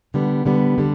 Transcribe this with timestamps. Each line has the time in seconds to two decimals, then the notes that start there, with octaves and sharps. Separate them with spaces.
0.14 D3 G3 B3
0.46 D3 G3 B3
0.78 D3 G3